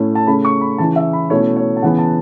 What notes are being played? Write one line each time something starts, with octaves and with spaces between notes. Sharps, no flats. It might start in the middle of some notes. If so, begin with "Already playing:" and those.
Already playing: A2 A3 C#4 E4
A5
C#3 A3 C#4 B5
C#6
B5
C#3 E3 C#4 E4 A5
E5
B5
B2 A3 C#4 E4 C#5
C#5
A5
C#3 E3 B3 F#5
A5